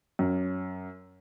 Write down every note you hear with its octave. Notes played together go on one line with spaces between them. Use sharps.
F#2